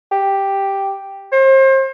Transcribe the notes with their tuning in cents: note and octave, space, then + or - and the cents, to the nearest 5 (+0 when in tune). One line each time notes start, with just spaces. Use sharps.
G4 +0
C5 +35